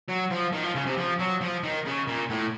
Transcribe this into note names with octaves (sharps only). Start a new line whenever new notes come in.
F#3
F3
D#3
F3
C#3
C3
F3
F#3
F3
D#3
C#3
A#2
A2